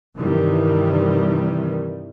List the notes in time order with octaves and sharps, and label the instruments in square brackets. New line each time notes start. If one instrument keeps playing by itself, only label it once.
[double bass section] G2 C3 D#3 E3 G3